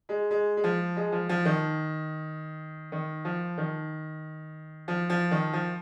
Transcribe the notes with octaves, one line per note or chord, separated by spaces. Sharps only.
G#3
G#3
G#3
F3
G#3
F3
F3
D#3
D#3
F3
D#3
F3
F3
D#3
F3